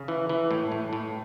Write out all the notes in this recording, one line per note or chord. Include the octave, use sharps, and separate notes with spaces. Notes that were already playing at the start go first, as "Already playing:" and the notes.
Already playing: C#3
E3
E3
A2
A2
A2